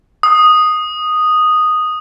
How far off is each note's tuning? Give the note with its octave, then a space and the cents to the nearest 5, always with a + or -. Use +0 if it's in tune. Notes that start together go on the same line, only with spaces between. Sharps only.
D#6 -5